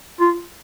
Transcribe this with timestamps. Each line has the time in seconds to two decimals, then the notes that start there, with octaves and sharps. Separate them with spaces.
0.20 F4